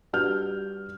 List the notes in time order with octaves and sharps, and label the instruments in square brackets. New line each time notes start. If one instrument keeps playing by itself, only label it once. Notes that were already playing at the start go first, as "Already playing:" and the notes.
[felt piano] G3 D4 F#4 B4 F6 G6